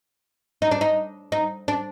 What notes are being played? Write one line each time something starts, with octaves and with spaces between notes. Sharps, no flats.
D#4
D4
D#4
D#4
D4